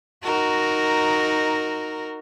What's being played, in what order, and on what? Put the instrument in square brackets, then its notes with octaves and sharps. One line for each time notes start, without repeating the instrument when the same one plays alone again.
[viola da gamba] D#4 F#4 A#4